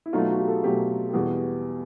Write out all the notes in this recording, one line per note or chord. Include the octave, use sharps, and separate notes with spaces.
E4
B2 F#3 A3 D#4 F4
F#4
F4 G4
A4
G#4
B2 F#3 A3 F4 G4
G4
E2 B2 G3 B3 F#4 G#4